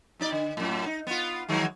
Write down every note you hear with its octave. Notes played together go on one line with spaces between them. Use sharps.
B2 D#4 D5
D3
F#2 A2
D#4
B3 F4
D#3 F#3 G#3